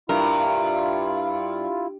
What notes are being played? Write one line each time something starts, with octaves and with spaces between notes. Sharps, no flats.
G2 E4 F4 A#4